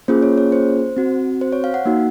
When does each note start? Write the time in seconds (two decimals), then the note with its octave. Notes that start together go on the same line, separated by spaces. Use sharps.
0.08 A#3 C#4 F4 G#4 C5
0.22 C#5
0.38 C#5
0.52 C5
0.97 C4 F#4
1.41 C5
1.52 C#5
1.64 F5
1.74 F#5
1.86 A#3 D#4 F#4